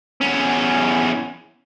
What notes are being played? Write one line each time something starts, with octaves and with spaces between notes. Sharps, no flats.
E2 C#4